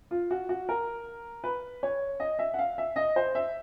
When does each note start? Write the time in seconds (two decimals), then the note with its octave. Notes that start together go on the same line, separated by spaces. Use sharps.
0.11 F4
0.31 F#4
0.49 F#4
0.69 A#4
1.44 B4
1.83 C#5
2.20 D#5
2.39 E5
2.54 F#5
2.59 F5
2.78 E5
2.96 D#5
3.16 C5
3.35 E5